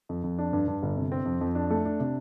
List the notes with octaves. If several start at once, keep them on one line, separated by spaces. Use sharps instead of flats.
F2
F2
D4
G2
G2
G1
C3
C4
F2
F2
D4
A3
D4
C3